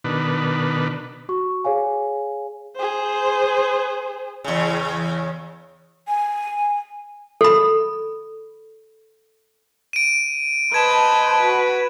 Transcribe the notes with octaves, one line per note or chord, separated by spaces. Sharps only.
B2 D#3 D4 B4
F#4 C#6
G#4 C#5 F5 G#5
G#4 C5
E2 C#3
G#5
A4 B5
D7 D#7
B4 C5 D#5 A5 G#6 E7
F#4